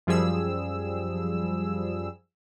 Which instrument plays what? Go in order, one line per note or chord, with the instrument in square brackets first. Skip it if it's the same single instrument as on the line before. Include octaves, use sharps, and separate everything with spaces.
[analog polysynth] F#2 F3 G3 G#4 E6